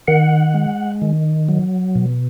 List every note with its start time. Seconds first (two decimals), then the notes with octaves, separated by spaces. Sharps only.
0.08 D#3 F#5
0.54 G#3
1.02 D#3
1.48 F#3
1.95 B2